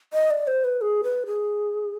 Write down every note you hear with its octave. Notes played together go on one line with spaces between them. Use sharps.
D#5
D5
C5
B4
G#4
B4
G#4